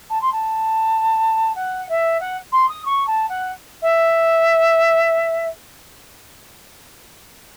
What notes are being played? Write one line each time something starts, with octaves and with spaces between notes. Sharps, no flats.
A5
C6
A5
F#5
E5
F#5
C6
D#6
C#6
A5
F#5
E5